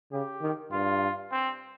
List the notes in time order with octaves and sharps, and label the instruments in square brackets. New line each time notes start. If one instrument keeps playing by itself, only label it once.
[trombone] C#3 [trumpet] G4
[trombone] D#3
[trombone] G2 [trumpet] F4
[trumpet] C4